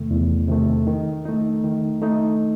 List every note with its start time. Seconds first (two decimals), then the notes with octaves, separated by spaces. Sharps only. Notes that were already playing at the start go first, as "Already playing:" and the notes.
Already playing: E2 C3 D#3 A3
0.11 E2
0.48 C3 D#3 A3
0.87 D#3
1.25 A3 D#4
1.64 D#3
2.02 A3 D#4